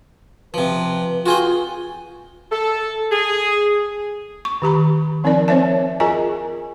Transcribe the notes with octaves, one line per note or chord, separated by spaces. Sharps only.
C3 F3 B4
F4 F#4 G#4 G5
A4
G#4
C#6
D#3 G4 A#5 B5
F3 C4 D#4 A#4 D5 A5
C4 C5 C#5 E5 A5
F4 G#4 A#4 D#5 G#5 A#5